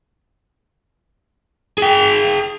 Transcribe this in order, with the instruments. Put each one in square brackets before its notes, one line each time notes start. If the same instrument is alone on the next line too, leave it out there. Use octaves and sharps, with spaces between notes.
[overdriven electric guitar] G#4 G5